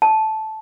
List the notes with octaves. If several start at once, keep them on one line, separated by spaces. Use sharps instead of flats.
A5